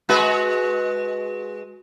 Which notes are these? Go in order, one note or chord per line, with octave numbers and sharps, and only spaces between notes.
G#3 F#4 B4